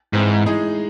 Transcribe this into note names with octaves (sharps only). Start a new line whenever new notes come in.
G#2 E3 C4 E4
A2 G#3 D#4 G#4